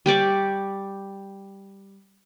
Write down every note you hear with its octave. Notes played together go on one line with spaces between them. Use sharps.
G3 G4 D5 C#6